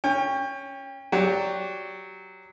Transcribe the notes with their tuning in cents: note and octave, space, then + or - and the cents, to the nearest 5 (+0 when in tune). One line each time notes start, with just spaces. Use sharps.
C#4 +0 G5 +30
F#3 +0 G4 +0 D5 -10